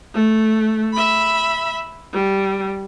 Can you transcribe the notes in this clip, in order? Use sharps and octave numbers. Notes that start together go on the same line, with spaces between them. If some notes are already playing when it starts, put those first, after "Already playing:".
A3
E5 B5
G3